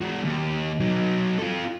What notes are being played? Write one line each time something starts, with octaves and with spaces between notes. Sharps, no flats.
G#3 F#4
D#2
F#3 D#4
F4 A4